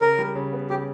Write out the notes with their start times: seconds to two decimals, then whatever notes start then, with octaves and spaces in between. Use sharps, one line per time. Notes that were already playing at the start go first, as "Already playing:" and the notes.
0.01 C#3 A#4
0.19 G3
0.35 C#3
0.53 B3
0.70 C#3 G4